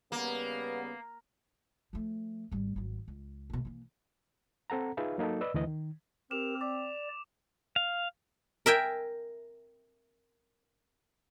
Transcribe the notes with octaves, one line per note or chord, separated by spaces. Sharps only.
C#3 G3 A#3 B3
F3 A3
G#1 G3
G#1 F#3
C#2
G2 B2
E3 A#3
C4 A4 F#5 A#5
D#4 F4 G#4 B4 E5 F5
F#3 A#3 D#4 F#4 A4
B4 D5 D#5 E6
D2 E3 D#5
D#3
C4 G4 A#4 E7 F7
D5 D6
F5
A#4 E5 G5 G#5